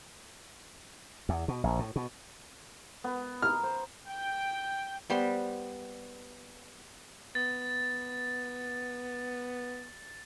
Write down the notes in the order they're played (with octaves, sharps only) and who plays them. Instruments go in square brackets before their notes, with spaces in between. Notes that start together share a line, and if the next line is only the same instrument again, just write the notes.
[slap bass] E2
B2
A#1
A2
B2
[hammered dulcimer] B3
[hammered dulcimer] A#5 [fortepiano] F6
[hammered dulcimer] C5
[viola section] G5
[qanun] G3 B3 C5 C6
[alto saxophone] B3 [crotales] A6